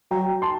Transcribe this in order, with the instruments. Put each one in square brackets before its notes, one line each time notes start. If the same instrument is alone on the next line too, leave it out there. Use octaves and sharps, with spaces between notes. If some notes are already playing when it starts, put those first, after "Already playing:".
[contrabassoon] F#3 [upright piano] G5 A#5
[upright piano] A5 C6